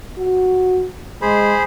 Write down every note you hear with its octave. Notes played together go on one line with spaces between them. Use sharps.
F#4
G#3 G#4 C5 B5